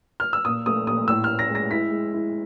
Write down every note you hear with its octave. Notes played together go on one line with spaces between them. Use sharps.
F6
E6
A#2 D#6
A3 D#6
A#2 D#6
A2 E6
F6
A2
A#6
G#3
A#6
E4 B6
G#3
E4